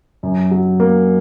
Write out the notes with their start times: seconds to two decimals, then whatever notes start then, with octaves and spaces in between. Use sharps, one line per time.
0.23 F#2
0.51 F#3
0.80 A#3